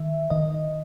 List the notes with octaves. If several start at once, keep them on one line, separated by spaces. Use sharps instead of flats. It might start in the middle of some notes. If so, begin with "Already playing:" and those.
Already playing: D#3 E5
D#3 D#5